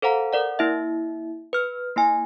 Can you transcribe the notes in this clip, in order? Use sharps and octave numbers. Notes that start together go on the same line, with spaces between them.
A4 C5 F5 F#5 A#5
A#4 D5 F#5
A#3 E4 E5
B4 F6
A#3 E4 G#5